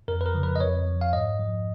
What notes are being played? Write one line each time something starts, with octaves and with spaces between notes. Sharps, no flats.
F2 A#4
B4
A#4
C#3 F3
B4
D#5
F2 C#5
F3
F5
G#2 D#5
F3